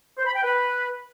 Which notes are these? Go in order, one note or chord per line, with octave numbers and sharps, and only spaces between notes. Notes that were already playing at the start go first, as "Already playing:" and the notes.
C5
B5
G5
B4